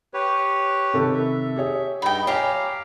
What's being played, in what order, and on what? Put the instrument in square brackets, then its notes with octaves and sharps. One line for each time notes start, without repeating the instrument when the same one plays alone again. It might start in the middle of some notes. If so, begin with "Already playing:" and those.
[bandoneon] G4 B4 C#5
[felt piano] C3 D#3 A4
[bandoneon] E5
[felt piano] G4 G#4 C#5
[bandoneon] G2 D#4 [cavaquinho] G5 B5
[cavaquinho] G4 A#5 [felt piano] C#5 G#5 [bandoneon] F5